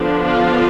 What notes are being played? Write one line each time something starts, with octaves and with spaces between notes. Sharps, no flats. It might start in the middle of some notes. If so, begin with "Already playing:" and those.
Already playing: D3 F3 B3 D4
F4